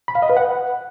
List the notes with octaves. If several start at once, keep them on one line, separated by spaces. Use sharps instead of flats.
B5
F5
D#5
B4
F#5